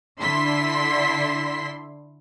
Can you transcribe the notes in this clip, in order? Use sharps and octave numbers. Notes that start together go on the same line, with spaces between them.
D3 E4 C6 B6